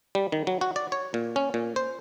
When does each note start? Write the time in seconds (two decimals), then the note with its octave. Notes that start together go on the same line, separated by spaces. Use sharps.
0.15 G3
0.32 D#3
0.47 F#3
0.61 F#4
0.76 D5
0.92 C#5
1.14 A#2
1.36 C#4
1.54 A#2
1.76 C5